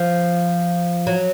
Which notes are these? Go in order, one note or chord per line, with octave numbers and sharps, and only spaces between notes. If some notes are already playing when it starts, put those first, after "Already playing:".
Already playing: F3
F#3